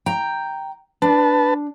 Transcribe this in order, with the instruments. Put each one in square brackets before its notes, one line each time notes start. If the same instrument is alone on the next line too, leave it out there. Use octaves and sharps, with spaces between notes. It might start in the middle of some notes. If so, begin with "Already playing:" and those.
[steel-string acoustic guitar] G5 A#5
[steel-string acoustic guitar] D4 [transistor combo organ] B4 A5